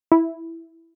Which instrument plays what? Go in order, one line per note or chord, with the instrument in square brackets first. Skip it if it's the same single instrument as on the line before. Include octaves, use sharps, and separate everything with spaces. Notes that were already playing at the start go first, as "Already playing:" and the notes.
[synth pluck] E4